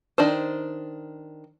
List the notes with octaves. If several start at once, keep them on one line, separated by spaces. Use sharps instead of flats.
D#3 D4 C5